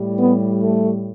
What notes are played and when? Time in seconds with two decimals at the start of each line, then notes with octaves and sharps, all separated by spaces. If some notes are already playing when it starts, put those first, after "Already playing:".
Already playing: A2 G3
0.17 B3
0.63 A3